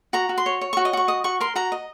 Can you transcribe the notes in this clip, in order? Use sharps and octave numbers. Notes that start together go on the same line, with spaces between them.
F#4 A#5
F#4
C6
C#5
C#5
C#6
F#4
D#5
F#4 C#6
D#5 D#6
F#4 C#6
A#4 C6
F#4 A#5
D#5